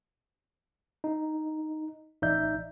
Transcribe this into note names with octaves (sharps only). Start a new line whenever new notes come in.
D#4
A1 D#4 D5 E5 G6